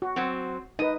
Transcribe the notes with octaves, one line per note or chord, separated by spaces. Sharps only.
F#4
F#3 C4 F#5
D#4 B4 D#5